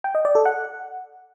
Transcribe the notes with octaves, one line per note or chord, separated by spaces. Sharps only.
G5
D#5
D5
A4
F#5